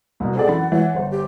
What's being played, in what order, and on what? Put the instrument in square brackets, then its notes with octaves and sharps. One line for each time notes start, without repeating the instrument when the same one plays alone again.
[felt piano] C2 B2
[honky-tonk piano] C4 G#4 D5 [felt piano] A4 [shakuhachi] F#5
[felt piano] F#2 E3 B5 [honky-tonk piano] A6
[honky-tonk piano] E3 [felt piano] C#5 [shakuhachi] F#5
[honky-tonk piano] G1 C5
[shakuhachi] G4